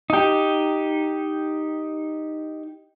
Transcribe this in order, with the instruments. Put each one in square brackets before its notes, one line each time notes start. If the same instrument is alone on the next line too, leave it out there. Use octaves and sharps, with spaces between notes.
[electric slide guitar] D#4 G4